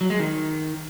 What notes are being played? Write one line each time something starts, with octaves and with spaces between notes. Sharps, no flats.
F#3
G#3
D#3